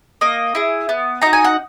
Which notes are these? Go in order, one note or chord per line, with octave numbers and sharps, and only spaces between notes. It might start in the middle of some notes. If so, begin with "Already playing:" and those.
A#3 D#5
E4 G#4
B3
D#4 F#4 A#5
G#5
F#5